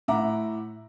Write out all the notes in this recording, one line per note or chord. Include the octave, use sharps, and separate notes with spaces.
A2 E5 F#5 A#5 D6